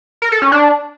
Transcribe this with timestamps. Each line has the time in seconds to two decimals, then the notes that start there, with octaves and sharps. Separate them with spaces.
0.22 A#4
0.32 A4
0.42 C#4
0.52 D4